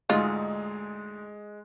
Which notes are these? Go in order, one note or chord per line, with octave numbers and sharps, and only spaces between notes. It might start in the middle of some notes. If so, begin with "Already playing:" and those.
D2 G#2 G#3 D#4 F4